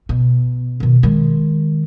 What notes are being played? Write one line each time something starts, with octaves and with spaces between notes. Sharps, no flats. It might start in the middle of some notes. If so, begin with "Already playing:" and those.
B2
B2 D#3
D#3 G#3